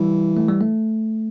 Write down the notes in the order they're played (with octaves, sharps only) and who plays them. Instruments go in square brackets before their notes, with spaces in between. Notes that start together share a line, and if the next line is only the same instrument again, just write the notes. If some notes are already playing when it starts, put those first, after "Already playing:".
Already playing: [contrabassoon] E3 [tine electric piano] G3
[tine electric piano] A3
G3
A3